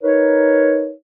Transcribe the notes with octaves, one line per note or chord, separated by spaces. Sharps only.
D#4 A#4 B4 C#5